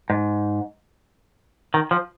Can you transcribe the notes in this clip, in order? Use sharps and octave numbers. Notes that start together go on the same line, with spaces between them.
G#2
D#3
F3